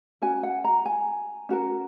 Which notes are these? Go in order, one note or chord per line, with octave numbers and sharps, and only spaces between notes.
C#4 F#4 A#4 G#5
F#5
A#5
G#5
C#4 F#4 A#4